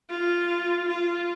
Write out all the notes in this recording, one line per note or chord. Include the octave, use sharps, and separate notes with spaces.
F4
F4